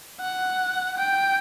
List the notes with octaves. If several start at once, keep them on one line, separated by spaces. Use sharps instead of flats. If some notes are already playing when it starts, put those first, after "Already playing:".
F#5
G5